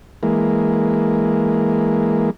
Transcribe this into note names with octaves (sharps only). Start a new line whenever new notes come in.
E3 G#3 A#3